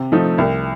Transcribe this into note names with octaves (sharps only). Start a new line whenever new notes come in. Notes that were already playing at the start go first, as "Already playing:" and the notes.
Already playing: C3
F3 A3 D#4
C2